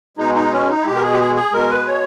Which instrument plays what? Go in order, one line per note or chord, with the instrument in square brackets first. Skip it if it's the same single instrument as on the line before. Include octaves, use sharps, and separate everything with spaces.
[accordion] B2 G#3 D#4
D#4
C#4
D#4
E4
B2 G#3 G4
A#4
G#4
G4
G#4
G#4
B2 G#3 A#4
B4
C#5